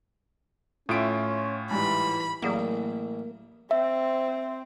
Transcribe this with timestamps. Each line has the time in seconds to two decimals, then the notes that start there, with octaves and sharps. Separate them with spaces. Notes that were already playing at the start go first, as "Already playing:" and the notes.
0.89 A2 C#4 F4 E5 D#6 D7
1.71 G#2 E3 G3 B5
2.43 A1 F#3 A#3 G#4 F#5
3.71 C4 E5